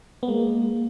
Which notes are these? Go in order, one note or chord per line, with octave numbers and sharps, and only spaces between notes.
B3
G#3 A#3